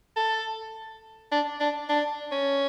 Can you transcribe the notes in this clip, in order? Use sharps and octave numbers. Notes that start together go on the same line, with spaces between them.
A4
D4
D4
D4
C#4